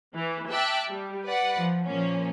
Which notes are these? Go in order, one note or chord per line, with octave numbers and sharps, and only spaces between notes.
E3
E5 G5 A5 D6 E6 F#6
G3
B4 D5 F#5
F3
A#2 F3 A#3 C#4